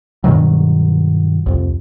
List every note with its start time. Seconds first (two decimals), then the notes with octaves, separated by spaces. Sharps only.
0.24 G2 B2 D#3 F#3
1.46 C2 F2